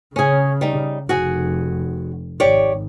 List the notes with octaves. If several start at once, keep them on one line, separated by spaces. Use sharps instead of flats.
C#3 C#4 G#4
G3 D#4
F1 F#4 G#4
G#1 G4 C#5 D5